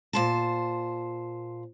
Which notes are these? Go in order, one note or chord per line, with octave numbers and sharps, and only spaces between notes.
A#2 C5 A5